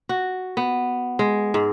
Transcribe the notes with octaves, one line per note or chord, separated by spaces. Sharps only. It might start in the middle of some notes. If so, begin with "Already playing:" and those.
F#4
B3
G#3
G#2